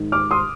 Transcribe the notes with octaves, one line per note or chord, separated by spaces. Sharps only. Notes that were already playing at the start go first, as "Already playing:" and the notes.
Already playing: G#2 D#3
D6 F6
C6 D#6